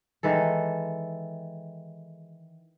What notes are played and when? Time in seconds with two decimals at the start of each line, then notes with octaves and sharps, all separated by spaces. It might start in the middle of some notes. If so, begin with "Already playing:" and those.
0.23 D#3 E3 G#3 A4